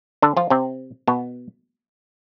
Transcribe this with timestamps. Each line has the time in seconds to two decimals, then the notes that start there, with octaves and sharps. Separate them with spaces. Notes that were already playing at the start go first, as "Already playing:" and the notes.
0.22 D3 D4
0.37 F3 F4
0.50 C3 C4
1.08 B2 B3